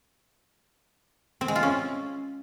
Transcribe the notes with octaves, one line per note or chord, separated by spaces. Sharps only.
C4
G#3
F4
C#4